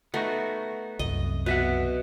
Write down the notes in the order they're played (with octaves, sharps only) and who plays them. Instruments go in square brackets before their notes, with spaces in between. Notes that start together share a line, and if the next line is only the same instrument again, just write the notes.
[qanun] A3 [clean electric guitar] B3 D#4 F#4
[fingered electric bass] C2 F#2 [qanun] D#5
[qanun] B2 [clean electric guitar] B4 E5 F#5